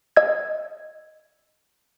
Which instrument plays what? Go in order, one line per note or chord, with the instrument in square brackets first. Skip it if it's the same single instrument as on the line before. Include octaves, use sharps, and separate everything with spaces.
[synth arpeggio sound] D#5 E6 G#6